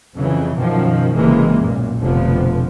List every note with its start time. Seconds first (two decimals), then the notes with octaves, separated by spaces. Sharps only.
0.16 F2 C#3 E3 F#3
0.55 F#2 B2 D#3 F3
1.15 F#1 C3 E3 G#3 A#3
1.58 B1 F#2 A#2
2.00 F1 B2 D3 F3 B3